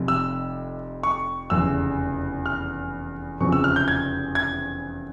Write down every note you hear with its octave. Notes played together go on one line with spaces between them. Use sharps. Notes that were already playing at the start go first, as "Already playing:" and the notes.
Already playing: F1 F2 C3
E6
C#6
F1 E2 C#3 E6
F6
F1 E2 C#3 F3 C4 C#6
E6
F6
G6
G#6
G#6